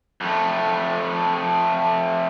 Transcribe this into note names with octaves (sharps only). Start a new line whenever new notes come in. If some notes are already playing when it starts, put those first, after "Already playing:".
F2 A3